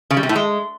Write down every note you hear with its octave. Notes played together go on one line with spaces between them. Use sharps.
C#3
G3
C3
A2
G#3